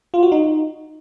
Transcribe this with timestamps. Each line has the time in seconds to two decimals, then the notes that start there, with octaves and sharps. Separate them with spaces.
0.14 F4
0.23 F#4
0.32 D#4